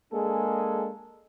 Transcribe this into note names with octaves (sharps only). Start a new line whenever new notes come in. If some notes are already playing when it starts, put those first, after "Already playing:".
G#3 A#3 D4 G#4 A4